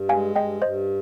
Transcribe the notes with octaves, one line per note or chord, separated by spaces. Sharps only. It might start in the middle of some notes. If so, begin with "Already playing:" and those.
Already playing: G2
G#3 F5 G#5
G2 D#5 G5
G2 C5 D#5